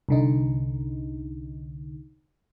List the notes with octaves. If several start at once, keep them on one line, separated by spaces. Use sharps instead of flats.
C2 D3 D#4